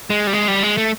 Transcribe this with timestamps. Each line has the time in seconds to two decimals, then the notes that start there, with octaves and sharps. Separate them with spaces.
0.10 G#3
0.27 G3
0.33 G#3
0.48 G3
0.63 G#3
0.77 A3